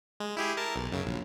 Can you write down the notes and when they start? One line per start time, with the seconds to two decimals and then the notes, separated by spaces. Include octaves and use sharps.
0.20 G#3
0.37 E4 G4 G#4
0.57 A#4 A5
0.76 B1
0.92 F#2 C#3
1.06 A#1